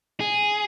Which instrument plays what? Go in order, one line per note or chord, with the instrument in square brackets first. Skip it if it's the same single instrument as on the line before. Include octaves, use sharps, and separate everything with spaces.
[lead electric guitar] G#4